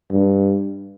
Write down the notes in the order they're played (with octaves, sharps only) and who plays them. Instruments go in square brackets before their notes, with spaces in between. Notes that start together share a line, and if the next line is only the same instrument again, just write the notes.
[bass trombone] G2